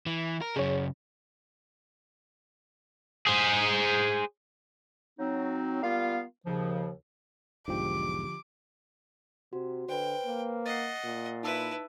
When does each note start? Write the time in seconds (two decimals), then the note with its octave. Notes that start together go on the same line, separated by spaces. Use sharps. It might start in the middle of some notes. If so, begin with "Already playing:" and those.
0.06 E3
0.41 A#4
0.56 F#2 C#3 G#4 C#5
3.27 G#4 C5
5.19 F#3 C4 D#4
5.83 G3 A#3 B3 F4 F5
6.46 D#2 C#3 F3
7.68 B1 E2 G#2 D3 F3 G4 D6
9.53 C3 F#4
9.89 D3 B4 C5 G5
10.26 A#3
10.66 D#5 F#5 A6 C7
11.04 A#2
11.43 D#4 E4 B4 A5 E6